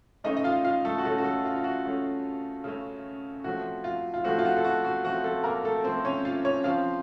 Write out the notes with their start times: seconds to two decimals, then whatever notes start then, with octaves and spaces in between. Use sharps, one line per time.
0.24 C#3 A3 C#4 D#4 D#5
0.37 D#5
0.44 F4 F5
0.65 F4 F5
0.85 A3 A4
0.98 F#4
1.05 C#3 A3 C#4 A4
1.18 F#4
1.24 A3 A4
1.45 F4
1.56 F4
1.64 F#4
1.85 C#3 A3 C#4
2.64 C#3 A3 C#4
3.44 A2 F3 A3 C4 F#4
3.84 F4
4.14 F4
4.24 A2 F3 A3 C4 F#4
4.39 F4
4.45 F#4
4.57 A4
4.64 F#4
4.84 F#4
5.04 A2 F3 A3 C4 F#4
5.24 A3 A4
5.44 A#3 A#4
5.64 A3 A4
5.84 A2 F3 A3 C4 C5
6.05 C#4 C#5
6.25 F4 F5
6.45 C#4 C#5
6.64 C#3 F3 C4 F4 F5